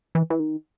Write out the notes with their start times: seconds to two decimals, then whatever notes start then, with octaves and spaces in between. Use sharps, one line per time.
0.15 E3
0.30 E3
0.40 D#3